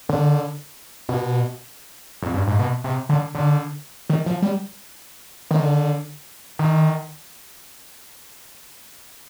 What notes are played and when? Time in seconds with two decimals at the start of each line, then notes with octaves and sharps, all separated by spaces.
0.09 D3
1.09 B2
2.22 F2
2.34 G2
2.47 G#2
2.59 B2
2.84 C3
3.09 D3
3.35 D3
4.10 D#3
4.26 F3
4.42 G3
5.51 D#3
5.60 D3
6.59 D#3